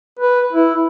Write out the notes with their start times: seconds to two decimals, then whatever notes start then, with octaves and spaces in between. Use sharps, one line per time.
0.19 B4
0.53 E4